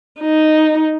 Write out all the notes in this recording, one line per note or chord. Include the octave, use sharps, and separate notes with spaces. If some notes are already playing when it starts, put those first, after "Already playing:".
D#4